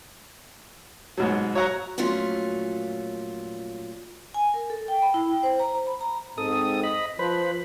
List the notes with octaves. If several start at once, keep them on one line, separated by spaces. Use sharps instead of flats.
G#2 B2 F#3
F#3 C#5 F#5 A#5
A#2 F3 F#3 A3 C#4 F4
G#5
A#4
A4
G5
B5
E4
G5
C5
A#5
C5
B5
A#5
G#2 C4 A4 D#6
D#5 B5
F3 B4 C5 B5